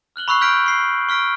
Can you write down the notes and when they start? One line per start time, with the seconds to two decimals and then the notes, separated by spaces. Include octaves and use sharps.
0.16 F6 F#6 F#7 G7
0.28 B5 C#6 E6 F#6 C7
0.41 E6 F6 G6 B6 C7 D7
0.66 C#6 C7
1.09 C#6 F6 B6 D7